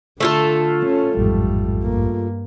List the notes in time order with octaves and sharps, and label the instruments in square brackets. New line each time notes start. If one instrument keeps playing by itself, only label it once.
[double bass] D3 [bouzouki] A3 F4 A4
[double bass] C#4
[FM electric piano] A1 F2 G#2 [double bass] G3
[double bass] G2 A#3